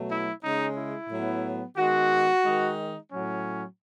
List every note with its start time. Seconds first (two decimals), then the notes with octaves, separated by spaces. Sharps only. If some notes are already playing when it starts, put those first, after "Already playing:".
Already playing: B2 F#3 A3
0.10 E4
0.43 C#3 G#3 C#4 D#4
0.77 E4
1.10 A2 F#3 B3
1.77 D#3 G#3 B3 F#4
2.44 D#3 G#3 D#4
3.11 A2 F#3 C#4